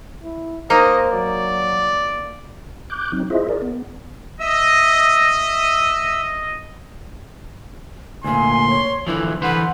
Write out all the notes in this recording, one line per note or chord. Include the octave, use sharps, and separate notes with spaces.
E4
A#3 D#4 C5 D#5
F#3 D5
D6 F#6 G6
F#3 C4 D#4
E4 F4 G#4 C5 D#5 E5
G#4 A#4 D5
B3
D#5 E5 E6
D2 A#2 G#5 C6
C#5
D3 E3 F3 E4
D3 E3 B4 C5 F#5